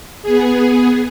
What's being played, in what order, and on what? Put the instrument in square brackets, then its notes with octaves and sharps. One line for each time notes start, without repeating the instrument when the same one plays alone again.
[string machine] B3 G#4